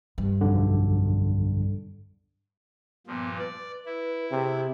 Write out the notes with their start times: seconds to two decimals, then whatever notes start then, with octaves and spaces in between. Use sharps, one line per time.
0.18 G2
0.41 B1 F2 D3
3.07 G2 A#2 F3 B3
3.38 B4 D5
3.86 E4
4.32 C3 G#4